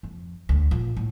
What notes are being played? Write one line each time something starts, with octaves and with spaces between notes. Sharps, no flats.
F2
D2
A#1
A2